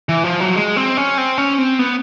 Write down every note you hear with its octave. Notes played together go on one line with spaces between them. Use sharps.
E3
F3
F#3
G#3
C4
C#4
C4
C#4
C4
B3